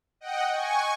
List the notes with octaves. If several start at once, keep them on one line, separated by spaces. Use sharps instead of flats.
D#5 F#5 G5
G#5 C#6